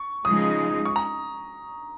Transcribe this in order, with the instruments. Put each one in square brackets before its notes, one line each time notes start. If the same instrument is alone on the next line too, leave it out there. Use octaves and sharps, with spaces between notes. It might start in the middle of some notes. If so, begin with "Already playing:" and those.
Already playing: [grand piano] C#6
[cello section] C#3 F3 G#3 D#4 [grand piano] D#6
[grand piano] C#6
A#5